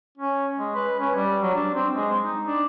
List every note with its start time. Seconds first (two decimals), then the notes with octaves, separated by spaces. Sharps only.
0.18 C#4
0.59 G#3
0.75 B4
0.99 C#4
1.15 G3
1.42 F#3
1.55 D4
1.75 C4
1.94 G#3
2.21 D#4
2.46 D4